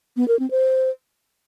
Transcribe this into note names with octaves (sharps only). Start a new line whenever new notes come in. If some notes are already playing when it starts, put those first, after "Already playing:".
B3
A#4
C4
C5